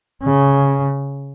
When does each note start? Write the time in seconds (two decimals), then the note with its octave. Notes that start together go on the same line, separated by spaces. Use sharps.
0.23 C#3